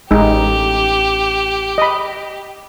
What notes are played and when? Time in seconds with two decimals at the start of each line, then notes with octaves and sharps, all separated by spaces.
0.11 A1 G#3 D#4 G4
1.78 D#5 B5